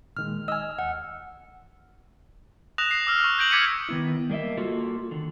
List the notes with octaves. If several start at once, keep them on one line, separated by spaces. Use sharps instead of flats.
A#2 D#3 G#3 F6
D#5 G#5 E6 F6
D#2 F#5
D#6 F#6 A#6 E7 F7
C7
D6 E6 F6
C#6
G6 A#6 D7 F#7
D6 G#6 B6 C#7 D#7 F#7
D#3 B3 E4
G3 A#3 D#5 E5
A#3 F4 F#4 A4
D3 D#3